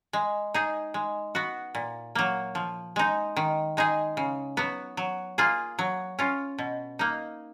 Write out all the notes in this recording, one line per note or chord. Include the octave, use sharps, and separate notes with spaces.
G#3
D#4 G#4
G#3
B3 F#4
A#2
F#3 A#3
F3
G#3 D#4
D#3
G#3 D#4 G#4
C#3
F#3 B3
F#3
A#3 F4 G#4
F#3
C#4 F4
B2
A#3 D#4